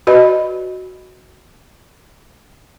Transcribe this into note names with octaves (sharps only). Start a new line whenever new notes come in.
F#4 B4 D5 D#5 B5